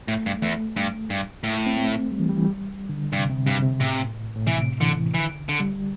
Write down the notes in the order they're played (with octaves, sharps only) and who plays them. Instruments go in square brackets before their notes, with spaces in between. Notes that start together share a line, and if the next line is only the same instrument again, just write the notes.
[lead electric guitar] A2 [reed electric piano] A3
[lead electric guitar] G2
[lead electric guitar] E2 [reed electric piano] A3
[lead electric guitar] G2
G2
A2
[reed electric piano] C4
A3
G3
E3
G3
E3
G3
D3
[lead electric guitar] G2 [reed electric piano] C3
[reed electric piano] C3
[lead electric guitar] G2 [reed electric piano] C3
[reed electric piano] C3
[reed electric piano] A2 [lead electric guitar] C3
[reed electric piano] A2
[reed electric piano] C3 [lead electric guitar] E3
[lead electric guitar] D3 [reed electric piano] E3
[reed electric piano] D3 [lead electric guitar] E3
[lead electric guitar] D3
[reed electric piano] G3